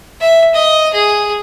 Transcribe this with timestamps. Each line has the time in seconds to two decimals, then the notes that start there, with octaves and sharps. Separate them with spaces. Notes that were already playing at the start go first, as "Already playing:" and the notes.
0.20 E5
0.54 D#5
0.93 G#4